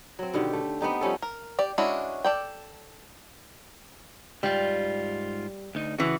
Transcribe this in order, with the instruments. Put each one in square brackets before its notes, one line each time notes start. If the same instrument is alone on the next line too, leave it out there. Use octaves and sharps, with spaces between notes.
[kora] F#3 C4
B2 D3 D#3 G4
A3
B3 C4 D#4 G4
F3 G3 C#4 A4
[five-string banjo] A#4
G4 D5
G#3 C#4 D4 E4 F#4
A4 D5 G5
[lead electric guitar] G#2 F4 [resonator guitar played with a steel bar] G3
[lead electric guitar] D2 D#4
[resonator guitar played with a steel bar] C#3 E3 [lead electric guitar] F#4